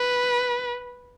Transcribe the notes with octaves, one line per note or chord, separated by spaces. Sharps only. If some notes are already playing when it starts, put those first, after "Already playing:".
Already playing: B4